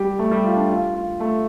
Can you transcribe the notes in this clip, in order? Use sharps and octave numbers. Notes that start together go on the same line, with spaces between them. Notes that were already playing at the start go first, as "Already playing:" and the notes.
Already playing: G3 G4
A3 A4
G3 G4
F4
D4
F4
F4
A3 A4